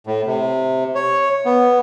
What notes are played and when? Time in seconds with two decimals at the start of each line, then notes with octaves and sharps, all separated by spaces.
0.07 A2
0.27 C3
0.95 C#5
1.45 B3